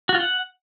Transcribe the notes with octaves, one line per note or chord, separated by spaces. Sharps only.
F#4
F4
F#5